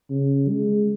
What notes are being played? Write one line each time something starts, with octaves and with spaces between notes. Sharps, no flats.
C#3
G#3